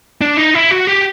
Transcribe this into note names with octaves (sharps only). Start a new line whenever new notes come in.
D4
D#4
E4
F#4
G4